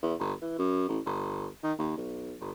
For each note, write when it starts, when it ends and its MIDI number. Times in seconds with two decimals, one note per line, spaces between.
0.03 0.14 40
0.19 0.33 31
0.42 0.54 52
0.58 0.87 42
0.88 0.99 33
1.06 1.47 31
1.63 1.72 51
1.79 1.92 39
1.97 2.35 35
2.40 2.51 31